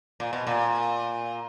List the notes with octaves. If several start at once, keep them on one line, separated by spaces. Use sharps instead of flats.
A#2
B2
A#2